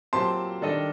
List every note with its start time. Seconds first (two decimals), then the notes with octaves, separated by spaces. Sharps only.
0.13 A#2 F#3 C4 G4 C5 A5 C6
0.62 D#3 G3 D4 A4 D#5